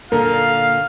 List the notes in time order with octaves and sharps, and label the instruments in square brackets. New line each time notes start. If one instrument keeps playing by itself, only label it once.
[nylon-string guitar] A#2 D3 [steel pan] A#4 [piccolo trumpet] F5